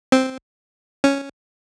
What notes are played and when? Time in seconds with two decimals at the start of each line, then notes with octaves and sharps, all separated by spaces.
0.12 C4
1.04 C#4